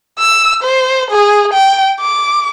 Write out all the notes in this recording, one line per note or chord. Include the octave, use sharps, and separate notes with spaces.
E6
C5
G#4
G5
D6